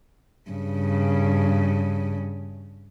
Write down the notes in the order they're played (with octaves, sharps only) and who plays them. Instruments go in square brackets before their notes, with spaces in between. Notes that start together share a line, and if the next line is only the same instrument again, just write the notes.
[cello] G2 C#3